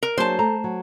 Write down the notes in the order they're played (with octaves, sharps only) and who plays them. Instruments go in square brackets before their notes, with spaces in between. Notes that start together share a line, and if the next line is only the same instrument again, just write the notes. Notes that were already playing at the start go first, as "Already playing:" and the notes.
[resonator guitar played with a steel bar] A#4
[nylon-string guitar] F#3 A#3 D4 [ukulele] G#4 [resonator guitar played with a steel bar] C5 A5
[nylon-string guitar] A3 [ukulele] A#5
[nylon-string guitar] F#3